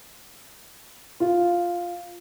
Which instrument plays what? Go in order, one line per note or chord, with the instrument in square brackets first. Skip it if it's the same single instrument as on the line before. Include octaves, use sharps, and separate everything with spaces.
[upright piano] F4